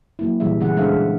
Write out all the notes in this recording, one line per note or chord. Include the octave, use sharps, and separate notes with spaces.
F#3 A#3 E4
A#2 E3 G3 F#4 G#4 E5
C#3 E3 G#3 B3 G#4 F#5
G#3 D4 A4 C5 E5 F5